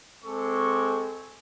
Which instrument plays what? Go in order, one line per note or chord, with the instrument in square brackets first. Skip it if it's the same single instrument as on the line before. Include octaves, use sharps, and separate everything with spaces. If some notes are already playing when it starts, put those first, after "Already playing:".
[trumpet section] G#3 C4 A4 C#6 D6